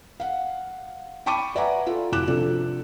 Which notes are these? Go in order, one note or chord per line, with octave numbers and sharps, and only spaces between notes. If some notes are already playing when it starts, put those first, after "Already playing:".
F5 F#5
G5 A5 B5 C#6 D6 D#7
B4 D5 E5 F#5 G#5 A#5
F4 A4
F1 E4 F#4 D6 F#6 E7
C3 F3 D4 A4